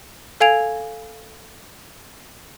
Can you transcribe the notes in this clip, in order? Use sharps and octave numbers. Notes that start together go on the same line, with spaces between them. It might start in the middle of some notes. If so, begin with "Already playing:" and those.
A4 F5 G#5 G#6 D7 F7